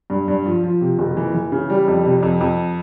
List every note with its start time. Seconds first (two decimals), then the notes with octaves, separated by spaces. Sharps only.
0.10 G2
0.28 G2
0.46 F3
0.64 F3
0.81 C3
0.99 F#1
1.17 E3
1.34 E3
1.52 C#3
1.70 G3
1.87 F2
2.05 C3
2.23 F2
2.41 F2